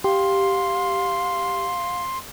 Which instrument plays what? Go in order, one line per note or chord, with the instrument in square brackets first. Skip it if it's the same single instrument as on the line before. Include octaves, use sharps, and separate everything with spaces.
[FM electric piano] G4 [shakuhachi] F5 [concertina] C6